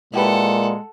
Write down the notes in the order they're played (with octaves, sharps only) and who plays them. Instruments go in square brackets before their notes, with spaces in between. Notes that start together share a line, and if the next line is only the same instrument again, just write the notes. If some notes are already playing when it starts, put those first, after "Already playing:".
[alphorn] A#2 [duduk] G#3 [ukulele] E4 G4 B4 [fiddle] A4 F#5